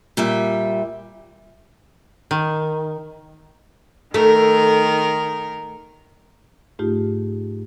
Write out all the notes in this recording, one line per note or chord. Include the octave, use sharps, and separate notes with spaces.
A#2 G3 E5
D#3
D#3 A3 A#4
G#2 A3 D#4 F4 G4